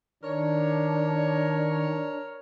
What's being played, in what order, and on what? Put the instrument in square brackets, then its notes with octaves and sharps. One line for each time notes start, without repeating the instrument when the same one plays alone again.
[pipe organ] D#3 [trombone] D4 [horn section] A#4 C#5